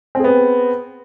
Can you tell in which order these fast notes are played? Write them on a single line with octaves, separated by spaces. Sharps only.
C4 G#4 B3